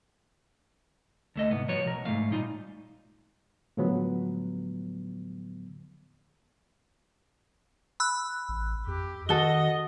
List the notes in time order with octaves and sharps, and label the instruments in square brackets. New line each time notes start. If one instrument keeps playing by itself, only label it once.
[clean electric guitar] D2 A3 D#5
C2 G#2 B3
F3 G3 F#4 B4 C#5
B1 A#4
G#2 E3 A3 F5
A#2 G3 D#4 F4
[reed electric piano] A2 D3 F3 F#3 G#3 B3
[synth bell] B5 E6 F#6
[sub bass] A1
[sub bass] F2 [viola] G4
[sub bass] D#3 [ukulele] F#4 A4 [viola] D#5 [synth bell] G7